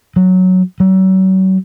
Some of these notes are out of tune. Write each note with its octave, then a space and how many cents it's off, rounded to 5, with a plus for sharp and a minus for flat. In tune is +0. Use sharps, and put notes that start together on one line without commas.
F#3 +0
F#3 +40